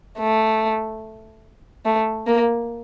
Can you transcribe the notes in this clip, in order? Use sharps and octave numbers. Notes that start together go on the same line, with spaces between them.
A3
A3
A#3